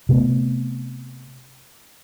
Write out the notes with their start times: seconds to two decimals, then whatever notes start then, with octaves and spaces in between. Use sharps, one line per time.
0.09 C3 A3 B3